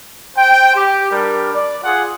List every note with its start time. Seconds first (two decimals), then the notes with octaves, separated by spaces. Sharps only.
0.36 C5 G5
0.76 G4
1.12 G3 D4 A#4
1.54 D5
1.84 F4 G#4 F#5